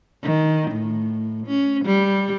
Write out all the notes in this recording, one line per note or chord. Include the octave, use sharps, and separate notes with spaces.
D#3
A2
C#4
G3